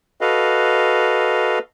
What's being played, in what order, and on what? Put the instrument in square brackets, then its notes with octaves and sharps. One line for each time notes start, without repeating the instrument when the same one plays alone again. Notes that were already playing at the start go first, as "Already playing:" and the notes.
[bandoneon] F#4 A4 B4 D#5 F5